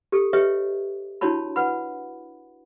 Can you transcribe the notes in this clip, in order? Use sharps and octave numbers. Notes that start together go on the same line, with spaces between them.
G4 A4
G4 B4 C#5 D#5 E5
D4 E4 F#4 C#5 A5 B5
B4 F#5 B5